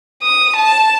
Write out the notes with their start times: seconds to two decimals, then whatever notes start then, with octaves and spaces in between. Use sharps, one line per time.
0.23 D#6
0.56 A5